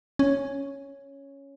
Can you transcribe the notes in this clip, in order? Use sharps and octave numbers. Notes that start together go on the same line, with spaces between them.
C#4